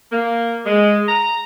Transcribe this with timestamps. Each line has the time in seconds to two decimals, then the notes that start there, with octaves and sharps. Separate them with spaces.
0.12 A#3
0.66 G#3
1.08 A#5